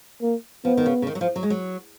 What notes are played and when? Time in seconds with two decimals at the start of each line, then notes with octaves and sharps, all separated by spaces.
0.22 A#3
0.65 F3 B3
0.77 D#3
0.86 C#3
1.02 C#3
1.07 D#3
1.15 F#3
1.21 F3
1.36 F#3
1.43 G#3
1.50 F#3